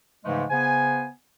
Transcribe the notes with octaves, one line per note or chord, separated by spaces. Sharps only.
G#2 C#3 E3 F3 G#3 A3
C#3 B3 C5 G#5